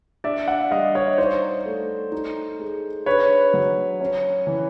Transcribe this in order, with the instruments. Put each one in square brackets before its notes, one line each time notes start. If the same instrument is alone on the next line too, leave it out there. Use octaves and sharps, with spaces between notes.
[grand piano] D4 D5 E5
E5 F#5
G3 D#5 F5
C#5 D#5
D#4 C5 D5
A3
D#4
G#3
D4 B4 C#5
F#3
C#4
E3